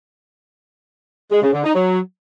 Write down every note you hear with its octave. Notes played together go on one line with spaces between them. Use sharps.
G#3
C#3
D3
D#4
F#3